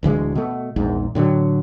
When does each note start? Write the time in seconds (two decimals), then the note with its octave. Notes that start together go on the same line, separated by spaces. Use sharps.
0.03 D1 D2 E3 G#3
0.35 B2 A3
0.76 A#1 E2 G#2
1.15 A2 D3 D#3 F#3